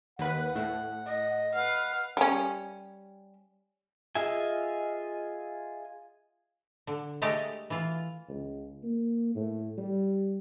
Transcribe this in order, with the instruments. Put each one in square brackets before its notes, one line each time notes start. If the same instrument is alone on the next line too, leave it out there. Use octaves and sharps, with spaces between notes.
[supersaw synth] D#2 B4 [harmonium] F#5
[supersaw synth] A2
[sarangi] D#5
[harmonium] B4 F#5 [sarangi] F5
[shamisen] G3 C#4
[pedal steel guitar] F4 G#4 D#5 E5 G#5
[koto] D3
G#3 A3 G4 D5 D#5 A#5
E3 F4
[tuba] C#2
A#3
A2
G3